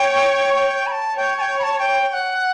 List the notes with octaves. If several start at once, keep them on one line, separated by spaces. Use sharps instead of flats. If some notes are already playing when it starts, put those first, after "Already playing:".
Already playing: C#5 G5
G5
B5
A5
C#5 G5
A5
G5
B5
A5
G5
G5
F#5